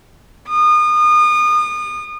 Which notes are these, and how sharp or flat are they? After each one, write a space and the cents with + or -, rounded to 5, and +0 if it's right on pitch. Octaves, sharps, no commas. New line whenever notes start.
D#6 -35